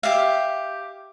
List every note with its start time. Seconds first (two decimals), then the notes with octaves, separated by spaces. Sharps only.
0.03 G4 E5 F5